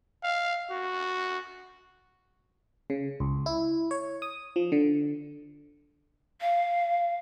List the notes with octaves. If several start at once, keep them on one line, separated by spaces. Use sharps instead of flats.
F5
F#4
C#3
C#2
E4
C#5
D#6
F3
D3
F5